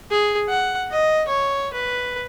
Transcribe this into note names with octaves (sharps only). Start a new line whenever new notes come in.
G#4
F#5
D#5
C#5
B4